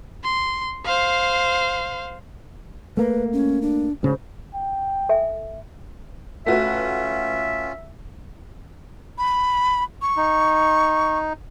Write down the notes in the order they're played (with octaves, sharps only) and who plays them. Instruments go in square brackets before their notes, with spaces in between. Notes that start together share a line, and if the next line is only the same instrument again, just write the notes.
[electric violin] C6
C5 F5
[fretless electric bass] A3 A#3 [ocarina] B4
[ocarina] C#4
D4
[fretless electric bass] D2 G#2 C#3 [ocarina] C5
[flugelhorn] G5
[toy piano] A4 E5 G#5
[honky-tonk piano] A3 F#4 B4 [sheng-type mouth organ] C#4 F4 [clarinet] E5
[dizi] B5
C#6
[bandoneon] D#4